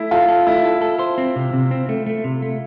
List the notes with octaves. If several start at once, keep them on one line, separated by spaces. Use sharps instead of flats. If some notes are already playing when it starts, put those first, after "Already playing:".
Already playing: A3 E4
F4 A4
A4
A3 E4
A4
A4
C5
C4
C3
C3
C4
A3
A3
C3
A3